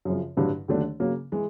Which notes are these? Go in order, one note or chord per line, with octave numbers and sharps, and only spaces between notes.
F#2 C#3 F3
A1 G2 D3 F#3
D#2 D3 F#3 A3 D4
C#3 F#3 A#3
E3 G#3